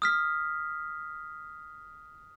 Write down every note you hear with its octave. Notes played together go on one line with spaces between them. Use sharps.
D#6 F6 B6